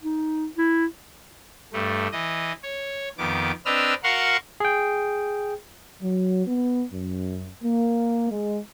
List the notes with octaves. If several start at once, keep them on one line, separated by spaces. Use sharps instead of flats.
D#4
E4
G2 A3
E3 D#5
C#5
F2 D#3 B3 D6
C4 D4 B4 D#5 E6 F6
F#4 A#4 F5 F#5 C6 C#6
G#4 G5
F#3
B3
F#2
A#3
G#3